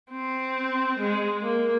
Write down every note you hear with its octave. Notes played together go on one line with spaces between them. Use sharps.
C4
G#3
A#3